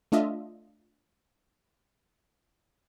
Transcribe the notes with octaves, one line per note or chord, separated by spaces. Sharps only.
A3 D4 F4 D#5 E5